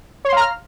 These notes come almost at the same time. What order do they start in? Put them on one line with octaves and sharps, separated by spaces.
C#5 C6 F5 A#5 F6